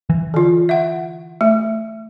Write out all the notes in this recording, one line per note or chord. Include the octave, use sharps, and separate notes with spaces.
E3
D3 F4
E5 F#5
A3